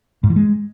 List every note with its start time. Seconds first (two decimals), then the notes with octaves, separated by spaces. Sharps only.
0.24 G#2
0.30 E3
0.36 G#3